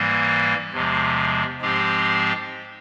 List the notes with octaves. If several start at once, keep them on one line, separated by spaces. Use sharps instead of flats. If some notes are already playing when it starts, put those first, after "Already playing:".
Already playing: G#2 E3 G3 A#3
E2 C3 F3 G#3
G#2 F3 G#3 C4 G4